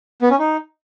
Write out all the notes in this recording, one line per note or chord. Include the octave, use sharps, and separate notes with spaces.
B3
C#4
D#4